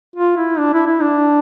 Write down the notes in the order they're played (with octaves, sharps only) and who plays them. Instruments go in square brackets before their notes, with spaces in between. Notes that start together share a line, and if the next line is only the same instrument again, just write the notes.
[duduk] F4
E4
D4
E4
E4
D4